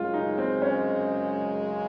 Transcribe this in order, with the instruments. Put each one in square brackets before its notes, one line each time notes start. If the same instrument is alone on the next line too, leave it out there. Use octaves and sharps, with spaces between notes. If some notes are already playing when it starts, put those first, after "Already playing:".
Already playing: [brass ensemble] F#2 C#3 G#3 [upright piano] F4
[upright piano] D#4
C4
C#4